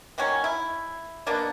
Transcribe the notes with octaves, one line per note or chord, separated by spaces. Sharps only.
D#3 F#3 A#3 C#4
E4
B2 A#3 B3 D4